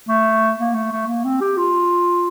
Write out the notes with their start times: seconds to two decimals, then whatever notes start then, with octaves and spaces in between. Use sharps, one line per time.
0.08 A3
0.59 A#3
0.74 A3
0.92 A3
1.07 A#3
1.24 C4
1.41 G4
1.57 F4